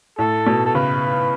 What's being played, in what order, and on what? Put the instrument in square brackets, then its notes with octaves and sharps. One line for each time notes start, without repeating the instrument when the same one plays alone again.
[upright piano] A2 [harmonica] A4
[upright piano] B2
[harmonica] A4
[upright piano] C#3 [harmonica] B4